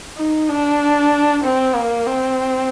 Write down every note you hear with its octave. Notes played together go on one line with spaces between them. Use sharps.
D#4
D4
C4
A#3
C4